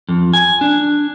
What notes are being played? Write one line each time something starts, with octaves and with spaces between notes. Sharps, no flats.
F2
G#5
D4